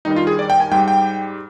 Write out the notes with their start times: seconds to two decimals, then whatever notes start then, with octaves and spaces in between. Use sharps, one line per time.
0.05 G2 D#3 G3 D#4
0.16 F4
0.27 G#4
0.39 D5
0.50 G5
0.60 G#5
0.71 G#2 G3 G5
0.88 G5